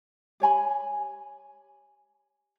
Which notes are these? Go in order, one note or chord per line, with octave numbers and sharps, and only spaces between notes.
G4 C#5 G#5 B5